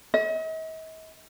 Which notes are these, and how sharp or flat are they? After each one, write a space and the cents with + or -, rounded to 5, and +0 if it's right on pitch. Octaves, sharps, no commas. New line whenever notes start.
D#5 +45